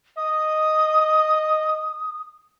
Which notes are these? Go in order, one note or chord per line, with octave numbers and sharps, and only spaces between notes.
D#5 D#6